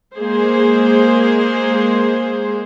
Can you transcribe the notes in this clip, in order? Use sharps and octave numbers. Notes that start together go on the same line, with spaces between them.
G#3 A#3 G#4 C5